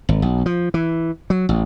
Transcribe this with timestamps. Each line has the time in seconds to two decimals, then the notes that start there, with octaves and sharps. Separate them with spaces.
0.09 G#1
0.22 B1
0.46 F3
0.74 E3
1.30 F#3
1.49 A1